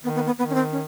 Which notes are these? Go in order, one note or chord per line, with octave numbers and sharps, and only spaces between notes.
D#3 B3
B3
B3
D#3 B3
C#4
C4
C#4